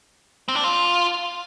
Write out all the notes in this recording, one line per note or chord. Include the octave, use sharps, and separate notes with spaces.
C4
D4
F4